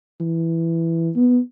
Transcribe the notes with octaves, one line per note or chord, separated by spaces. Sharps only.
E3
B3